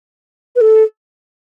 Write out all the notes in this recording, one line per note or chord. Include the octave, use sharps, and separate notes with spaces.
B4
A4